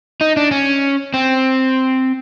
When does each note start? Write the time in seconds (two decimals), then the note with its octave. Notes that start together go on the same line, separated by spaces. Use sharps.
0.21 D#4
0.37 D4
0.51 C#4
1.14 C4